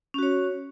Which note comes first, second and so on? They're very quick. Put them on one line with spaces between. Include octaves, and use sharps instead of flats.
C#4 F#4 C#5